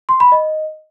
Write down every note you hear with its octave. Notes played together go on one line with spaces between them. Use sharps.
C6
B5
D#5